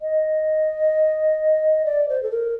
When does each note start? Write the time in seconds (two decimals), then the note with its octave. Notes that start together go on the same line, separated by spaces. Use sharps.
0.01 D#5
1.85 D5
2.08 C5
2.22 A4
2.30 A#4